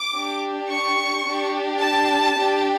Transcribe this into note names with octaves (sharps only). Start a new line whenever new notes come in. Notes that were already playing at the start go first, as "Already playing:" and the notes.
Already playing: D6
D4 G4
C#6
D4 G4
A5
D4 G4